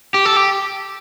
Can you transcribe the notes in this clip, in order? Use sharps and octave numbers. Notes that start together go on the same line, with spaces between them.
G4
A4
G4